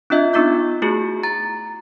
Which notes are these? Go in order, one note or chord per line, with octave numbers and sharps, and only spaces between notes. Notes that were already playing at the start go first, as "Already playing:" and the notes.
C4 D4 F4 D#5 E5
B3 D#4 F4 D6 G6
A3 E4 F#4 G#4
A#5 A6